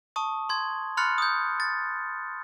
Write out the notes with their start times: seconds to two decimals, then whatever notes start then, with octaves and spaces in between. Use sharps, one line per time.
0.16 A5 C#6 D#6
0.49 C6 G#6
0.97 B5 C6 F6 F#6 A6 C#7
1.18 D#6 G6
1.60 A6